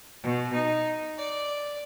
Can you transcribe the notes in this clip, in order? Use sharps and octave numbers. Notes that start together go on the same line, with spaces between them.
B2
D#4
D5